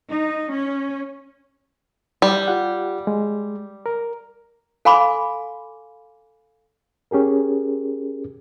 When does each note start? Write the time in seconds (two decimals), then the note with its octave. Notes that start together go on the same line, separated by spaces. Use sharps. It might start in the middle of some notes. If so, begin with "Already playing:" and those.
0.10 D#4
0.51 C#4
2.22 G3
2.48 F4 G4 F#5
3.07 G#3
3.86 A#4
4.85 A4 F5 G#5 B5 C6 D6
7.11 C#4 G4 G#4 A#4